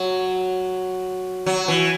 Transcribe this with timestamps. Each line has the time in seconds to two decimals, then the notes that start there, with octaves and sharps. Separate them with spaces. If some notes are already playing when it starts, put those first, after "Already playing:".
Already playing: F#3
1.46 F#3
1.68 E3